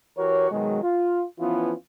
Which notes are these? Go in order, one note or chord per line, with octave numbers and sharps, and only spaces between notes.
E3 F#4 G4 A#4 C#5
B2 D#3 F#3 G#3
F4
E3 F3 B3 C#4 E4 F4